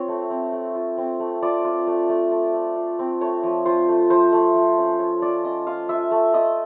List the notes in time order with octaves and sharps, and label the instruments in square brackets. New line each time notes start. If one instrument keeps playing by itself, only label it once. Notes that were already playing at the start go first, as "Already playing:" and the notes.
Already playing: [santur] C4 F4 C#5
A3
C4
A3
F4
C4
A3
F4 D5
F4
A3
A3
A3
A3
F4
C4
A3 C#5
F3
F4 C5
A3
F3 C5
A3
F3
C#4
A3 C#5
F4 D5
C#4 D#5
F4 F5
F4 E5
A3
F4 D#5